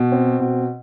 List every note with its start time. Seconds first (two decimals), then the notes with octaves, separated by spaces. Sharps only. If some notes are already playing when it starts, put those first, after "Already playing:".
Already playing: B2
0.12 C4
0.40 B2